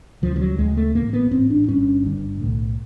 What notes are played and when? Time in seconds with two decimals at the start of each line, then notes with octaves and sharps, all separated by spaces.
0.22 D2 C#3 F3
0.36 F3
0.40 F#3
0.58 D2 C#3 G#3
0.77 A3
0.95 A1 G#2 A#3
1.13 B3
1.31 A1 G#2 C4
1.50 D4
1.68 G1 G2 D3 C#4
2.04 G1 G2 D3
2.41 B1 A2